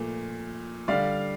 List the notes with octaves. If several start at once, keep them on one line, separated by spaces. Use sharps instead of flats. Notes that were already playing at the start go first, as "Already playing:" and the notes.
Already playing: A#2 F3 A3
D3 G3 D5 F5